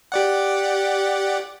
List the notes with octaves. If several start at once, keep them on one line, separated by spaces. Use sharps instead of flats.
G4 D5 F#5